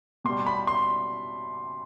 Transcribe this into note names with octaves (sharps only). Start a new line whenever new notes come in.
B2 C6
G3
B5
C6